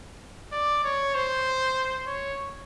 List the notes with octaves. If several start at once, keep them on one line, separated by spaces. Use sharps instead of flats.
D5
C#5
C5
C#5